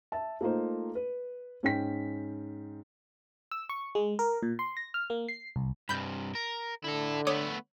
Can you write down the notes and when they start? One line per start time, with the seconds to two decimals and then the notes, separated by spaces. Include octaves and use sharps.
0.12 E5 A5
0.41 A3 A#3 D#4 F4 C5
0.95 B4
1.63 G#2 C#4 G5 B6
3.52 E6
3.69 C#6
3.95 G#3
4.19 A#4
4.43 A#2
4.59 C6
4.77 A#6
4.94 F6
5.10 A#3
5.29 C7
5.56 C2
5.89 G2 C3 B5 G6
6.35 A#4
6.84 D3 E4 A4
7.27 A3 B3 C#5 D6 D#6